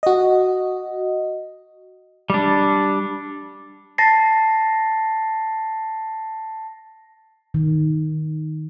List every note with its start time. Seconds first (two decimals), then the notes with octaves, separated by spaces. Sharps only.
0.03 F#4 D#5
2.30 G3 D4
3.98 A5 A6 A#6 C7
7.54 D#3